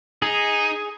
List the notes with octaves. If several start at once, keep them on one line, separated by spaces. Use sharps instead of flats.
D#4 G#4